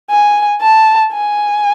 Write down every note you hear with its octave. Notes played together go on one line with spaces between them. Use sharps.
G#5
A5
G#5